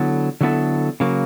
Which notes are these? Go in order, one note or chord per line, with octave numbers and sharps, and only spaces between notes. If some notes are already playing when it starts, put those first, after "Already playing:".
Already playing: D3 F#3 B3 E4 A4
D3 F#3 B3 E4 A4
C#3 F#3 A#3